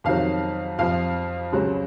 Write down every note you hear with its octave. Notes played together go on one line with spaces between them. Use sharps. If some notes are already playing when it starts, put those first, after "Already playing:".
F2 D#3 F#3 F5
F2 F3 F5
C#2 C#3 F#3